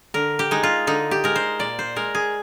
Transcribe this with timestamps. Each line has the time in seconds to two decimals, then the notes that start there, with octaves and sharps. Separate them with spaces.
0.14 D3 A#4
0.39 G4
0.51 G#3 D#4
0.63 F4
0.87 D3 D#4
1.11 G4
1.24 G#3 A#4
1.36 C5
1.59 A#2 D5
1.79 C5
1.96 G#3 A#4
2.15 G#4